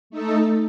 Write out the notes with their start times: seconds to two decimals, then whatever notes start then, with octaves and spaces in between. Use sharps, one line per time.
0.10 A3 D#4 A4